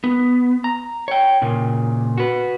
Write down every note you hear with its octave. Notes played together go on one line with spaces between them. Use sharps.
B3
A#5
C#5 G5
A#2 C#3
F#4 B4